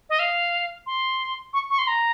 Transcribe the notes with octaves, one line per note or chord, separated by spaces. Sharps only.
D#5
F5
C6
C#6
C#6
C6
A#5